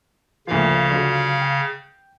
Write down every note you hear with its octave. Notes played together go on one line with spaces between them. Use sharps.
D2 A#2 C#3 F3 F5
D3 F#3 F4
G5